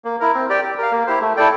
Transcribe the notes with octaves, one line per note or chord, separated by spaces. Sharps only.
A#3
E4 A#4
C4
G4 D5 G5
G4
A#4 F5
A#3
E4 G4 C5
A3
E4 A4 D5 G5